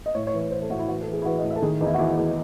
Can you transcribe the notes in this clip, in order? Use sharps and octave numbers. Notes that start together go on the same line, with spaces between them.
D#5
A2 C#5
C#5
E3
C#5
E3 C5
A4
A2 F#4
E4
E3 F#4
A4
E3
G#4
E4
E3 F#4
D#5
A2
E5
A4
D#3 G#4
E2 D#4
E4
F#4
E2 E4
E2